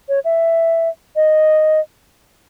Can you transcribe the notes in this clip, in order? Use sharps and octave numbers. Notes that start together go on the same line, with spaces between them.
C#5
E5
D#5